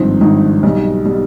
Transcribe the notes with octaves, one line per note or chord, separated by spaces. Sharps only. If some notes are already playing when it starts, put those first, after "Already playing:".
Already playing: G#1 G2 F3 C4 D#4
G#1 G2 F3 C4 D#4
B1 B2 G3
B2 G3